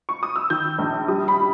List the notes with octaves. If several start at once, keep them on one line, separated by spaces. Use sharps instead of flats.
C#6
D#6
E6
D#3 G6
A#1
G3 D#6
B5